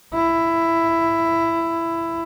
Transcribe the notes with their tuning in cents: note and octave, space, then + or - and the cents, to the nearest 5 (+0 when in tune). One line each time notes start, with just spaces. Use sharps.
E4 +10